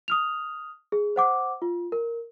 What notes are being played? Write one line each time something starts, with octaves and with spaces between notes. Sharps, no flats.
D#6 F6 F7
G#4
C5 F#5 D6
F4
A#4